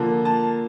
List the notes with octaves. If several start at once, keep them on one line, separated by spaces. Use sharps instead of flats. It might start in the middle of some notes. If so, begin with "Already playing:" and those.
Already playing: D3 F3 A#3
A5